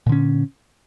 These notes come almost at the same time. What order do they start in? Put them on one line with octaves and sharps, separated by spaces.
A#2 D3 C#4